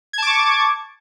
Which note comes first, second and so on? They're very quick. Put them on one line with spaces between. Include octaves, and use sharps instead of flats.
G#6 A5 D6 C#6